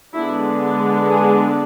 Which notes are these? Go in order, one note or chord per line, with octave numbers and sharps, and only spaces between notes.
D3 G#3 B3 D4 E4
G#4